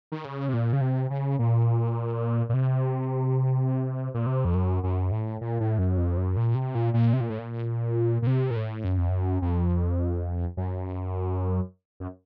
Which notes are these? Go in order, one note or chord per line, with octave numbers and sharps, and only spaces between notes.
D#3
C#3
C3
A#2
C#3
C3
C#3
A#2
A#2
C3
A#2
C3
F2
F#2
F#2
A2
A#2
A2
F#2
F2
F#2
A#2
C3
A#2
A#2
C3
A#2
A2
A#2
A#2
C3
A#2
A2
F#2
F2
F#2
F2
F#2
F#2